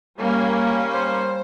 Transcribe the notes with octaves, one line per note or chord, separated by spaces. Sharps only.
G3 A#3 C#4
C5